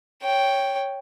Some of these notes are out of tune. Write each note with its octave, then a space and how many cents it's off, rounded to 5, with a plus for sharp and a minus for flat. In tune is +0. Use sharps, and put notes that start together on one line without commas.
C#5 +0 G5 +0